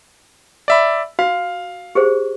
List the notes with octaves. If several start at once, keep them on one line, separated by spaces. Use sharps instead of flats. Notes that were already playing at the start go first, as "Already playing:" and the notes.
D5 E5 B5
F#4 F5
G4 G#4 C5